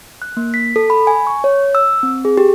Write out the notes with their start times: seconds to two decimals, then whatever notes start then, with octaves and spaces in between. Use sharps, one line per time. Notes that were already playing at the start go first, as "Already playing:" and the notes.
0.22 F#6
0.37 A#3
0.54 B6
0.76 A4
0.90 B5
1.07 G#5
1.27 C#6
1.44 C#5
1.75 E6
2.03 C4
2.25 G#4
2.38 G4